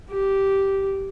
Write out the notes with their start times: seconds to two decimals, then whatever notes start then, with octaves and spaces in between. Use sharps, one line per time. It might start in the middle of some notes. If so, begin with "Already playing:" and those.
0.11 G4